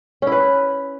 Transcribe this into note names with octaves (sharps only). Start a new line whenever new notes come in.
C#4 E4 B4